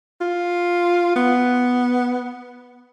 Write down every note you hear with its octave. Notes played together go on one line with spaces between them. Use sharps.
F4
B3